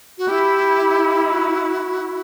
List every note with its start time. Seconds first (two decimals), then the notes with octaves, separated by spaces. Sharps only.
0.18 F#4
0.29 E4 G4
1.32 F#4